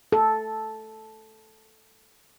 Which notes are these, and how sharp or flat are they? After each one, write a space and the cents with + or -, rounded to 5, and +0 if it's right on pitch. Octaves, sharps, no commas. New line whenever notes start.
A4 -5